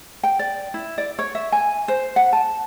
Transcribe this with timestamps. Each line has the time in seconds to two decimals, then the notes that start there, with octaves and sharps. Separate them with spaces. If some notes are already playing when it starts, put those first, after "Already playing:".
0.23 G5
0.39 D5
0.74 E4
0.98 D5
1.19 C#5
1.35 E5
1.52 G#5
1.88 C5
2.16 F#5
2.33 A5